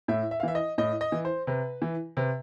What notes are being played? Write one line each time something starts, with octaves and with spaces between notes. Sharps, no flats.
A2 E5
E5
F5
E3 E5
D#5
A2 D#5
D#5
E3
C5
C3 B4
E3
C3 B4